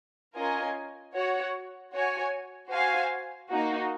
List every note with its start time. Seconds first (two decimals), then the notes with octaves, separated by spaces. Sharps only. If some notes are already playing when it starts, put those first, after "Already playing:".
0.36 C#4 F4 A#4 D#5 G#5
1.14 F#4 C#5 F#5
1.93 F#4 C#5 G#5
2.70 F#4 C5 F5 G#5
3.49 A#3 D#4 F#4